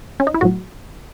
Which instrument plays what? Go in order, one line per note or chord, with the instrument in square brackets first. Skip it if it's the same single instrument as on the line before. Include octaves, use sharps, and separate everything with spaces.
[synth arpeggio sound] C#4
D#4
E4
A2 F#3 F#4